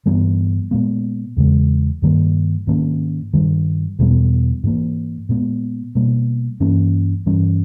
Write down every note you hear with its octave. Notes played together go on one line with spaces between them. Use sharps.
G2 E3 G3 B3
A#2 G#3 B3
E2 C#3 G#3
G2 D#3 G3 A#3
G#2 D#3 A#3 C#4
G2 D#3 G3
E2 B2 G3 B3
G#2 E3 A#3
A#2 G#3 B3
B2 G3 A#3
G2 E3 A#3 C#4
G2 E3 G3 C#4